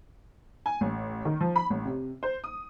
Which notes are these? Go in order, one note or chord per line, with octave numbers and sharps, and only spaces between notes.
G#5
A1
D#3
F3
B5
A1
C3
C5
D#6